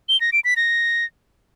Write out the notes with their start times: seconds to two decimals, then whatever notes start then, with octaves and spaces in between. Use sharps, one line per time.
0.09 G7
0.21 A#6
0.33 D7
0.44 B6
0.56 A#6